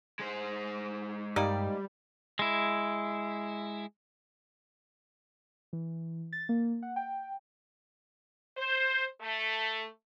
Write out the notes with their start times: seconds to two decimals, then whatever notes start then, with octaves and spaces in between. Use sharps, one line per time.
0.19 G#3 C5
1.36 G2 G3 A#3 D#4 D5
2.39 G#3 E4
5.73 E3
6.33 A6
6.49 A#3
6.82 F#5
6.96 G5
8.57 C5
9.21 A3